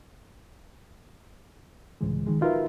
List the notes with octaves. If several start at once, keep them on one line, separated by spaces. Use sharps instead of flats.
C#2 A2 C3 E3 G#3
D#3 F3 G#3
D#4 F4 F#4 A#4 B4 E5